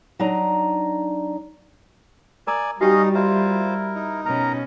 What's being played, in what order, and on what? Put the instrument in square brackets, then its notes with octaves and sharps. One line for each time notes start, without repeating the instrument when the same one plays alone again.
[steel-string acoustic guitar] F#3 D4 D#4 D5 A#5
[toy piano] A#4 A#5 D#6 [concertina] D5 G#5
[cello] G3 [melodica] C#4 D#5 F5 [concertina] D#4 [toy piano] F#4 G4 G5
[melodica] E4 A#4 [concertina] F4 C5 [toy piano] D#5 E5
[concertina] D#4
[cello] B2 C#4 [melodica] A#4 A#5